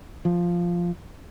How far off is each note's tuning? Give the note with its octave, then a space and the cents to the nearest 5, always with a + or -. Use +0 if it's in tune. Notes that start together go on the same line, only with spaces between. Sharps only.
F3 -5